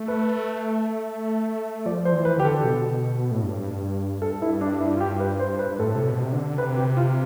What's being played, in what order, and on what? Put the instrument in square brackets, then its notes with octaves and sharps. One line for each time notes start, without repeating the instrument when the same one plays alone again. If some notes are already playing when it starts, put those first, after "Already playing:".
Already playing: [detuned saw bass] A3
[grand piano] B4
[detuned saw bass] F3 [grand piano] D5
[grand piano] C5
[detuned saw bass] E3
[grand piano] B4
[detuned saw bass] D3 [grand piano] G4
[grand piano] A4
[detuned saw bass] B2
A2
G2
[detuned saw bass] G2 [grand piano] A4
[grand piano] E4
D4
E4
F4
G4
B4
C5
B4
[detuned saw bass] G2
[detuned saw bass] A2 [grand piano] A4
[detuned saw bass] C3
B2
C3
D3
[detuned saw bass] C3 [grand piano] B4
[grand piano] G4
F4